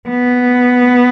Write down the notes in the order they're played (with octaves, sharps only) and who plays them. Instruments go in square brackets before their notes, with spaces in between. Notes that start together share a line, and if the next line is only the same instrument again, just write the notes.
[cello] B3